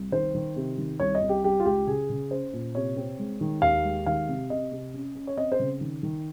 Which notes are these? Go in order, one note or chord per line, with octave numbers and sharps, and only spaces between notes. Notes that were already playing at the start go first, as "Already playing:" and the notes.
Already playing: C2
D#3 C5
D#3
C3
D#3
C2 C#5
D#5
C2
G4
G3 G4
F4
C#2 G4
C#3 G#4
C#3
C#4 C5
A#2
C3 C#5
C4
G#3
D#3
D#2 F5
G#3
D#3 F5
C3
C3 D#5
C3
C#4
C#4
C#5
C4 D#5
C5
C#3
D#3
D#3